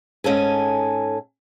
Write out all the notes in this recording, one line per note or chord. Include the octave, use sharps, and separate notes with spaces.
G#2 C#4 A4 G#5